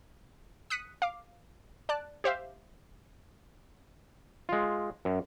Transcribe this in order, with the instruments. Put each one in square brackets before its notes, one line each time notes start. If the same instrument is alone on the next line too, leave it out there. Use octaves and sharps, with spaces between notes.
[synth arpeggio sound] D#6 F#6 B6 C#7 D#7
F5 D6
D5 A5 F#6
G4 C5 E5 F5
[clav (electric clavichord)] G#3 F4
F#2